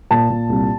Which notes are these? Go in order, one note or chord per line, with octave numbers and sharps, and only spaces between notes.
A#2 A5
A#2
C2